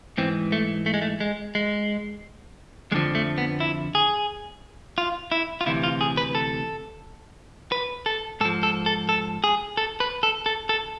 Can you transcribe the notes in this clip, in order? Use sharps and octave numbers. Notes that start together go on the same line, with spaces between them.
G#2 E3 C4
A3
A3
G#3
A3
G#3
G#3
F2 D3 F3 G#3
A3
B3
E4
G#4
F4
E4
F4
D2 C3 E3 E4
F4
G#4
B4
A4
B4
A4
G#2 F3 A4
A4
A4
A4
G#4
A4
B4
A4
A4
A4